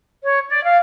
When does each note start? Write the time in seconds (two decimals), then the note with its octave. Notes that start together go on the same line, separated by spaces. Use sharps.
0.23 C#5
0.48 D5
0.64 F5